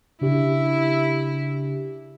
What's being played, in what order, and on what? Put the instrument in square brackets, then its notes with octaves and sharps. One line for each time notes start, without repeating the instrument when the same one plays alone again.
[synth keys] C#3 D4 G4 [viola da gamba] E4